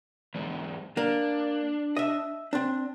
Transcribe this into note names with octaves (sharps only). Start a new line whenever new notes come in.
E2 G#2
A#3 D4
D#5 E5
C4 D4